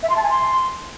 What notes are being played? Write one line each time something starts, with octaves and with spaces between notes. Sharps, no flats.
E5
C6
A5
G#5
C6